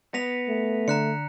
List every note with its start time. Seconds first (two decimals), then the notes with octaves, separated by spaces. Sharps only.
0.14 B3 A#6 B6 F7
0.49 A3
0.88 D3 A#5 F#6 C#7